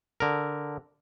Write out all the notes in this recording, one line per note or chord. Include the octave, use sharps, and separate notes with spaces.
D3 A#4